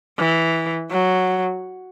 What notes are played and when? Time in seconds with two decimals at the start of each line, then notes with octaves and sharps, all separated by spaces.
0.19 E3
0.91 F#3